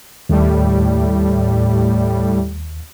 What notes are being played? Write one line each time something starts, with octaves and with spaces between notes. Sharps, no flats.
D#2 A2 G3